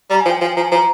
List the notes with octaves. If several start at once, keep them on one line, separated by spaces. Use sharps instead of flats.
G3 A#5
G#5
F3
G5
F3 G#5
F3 A#5
G#5
F3 A#5